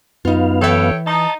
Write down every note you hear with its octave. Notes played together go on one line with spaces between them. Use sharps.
F#2 B3 D#4 F4 F5
E3 A4 C#5 E5 G5
D#4 A5